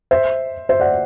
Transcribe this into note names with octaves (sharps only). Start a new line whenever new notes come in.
C5 E5
C5 E5
D5 F#5